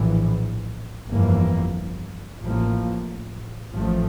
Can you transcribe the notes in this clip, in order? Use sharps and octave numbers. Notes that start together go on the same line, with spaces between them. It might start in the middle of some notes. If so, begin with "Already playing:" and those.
Already playing: A#1 A2 E3
G1 F2 E3 A#3
A1 A2 F3 A#3
A1 A2 F3 A3